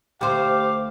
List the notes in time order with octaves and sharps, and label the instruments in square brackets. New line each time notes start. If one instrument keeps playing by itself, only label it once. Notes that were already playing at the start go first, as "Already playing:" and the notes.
[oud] D2 C5 [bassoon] G4 [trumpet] F5 [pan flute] D6